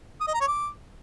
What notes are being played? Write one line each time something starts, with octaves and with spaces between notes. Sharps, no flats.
D#6
D#5
A#5
C#5
D6